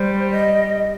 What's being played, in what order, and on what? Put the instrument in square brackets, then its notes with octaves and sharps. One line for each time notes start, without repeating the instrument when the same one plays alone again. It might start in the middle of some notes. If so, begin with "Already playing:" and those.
Already playing: [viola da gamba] G3 [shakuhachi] C5
[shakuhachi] D#5